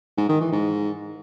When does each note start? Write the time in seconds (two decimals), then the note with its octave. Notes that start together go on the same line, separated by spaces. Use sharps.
0.18 G#2
0.29 D#3
0.40 E3
0.52 G#2